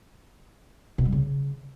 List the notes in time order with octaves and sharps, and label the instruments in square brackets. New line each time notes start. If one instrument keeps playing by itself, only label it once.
[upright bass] B2
G3
C#3